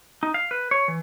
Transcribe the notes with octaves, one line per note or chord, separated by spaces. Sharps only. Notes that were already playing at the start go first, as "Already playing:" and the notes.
D#4
F5
B4
C#5
E3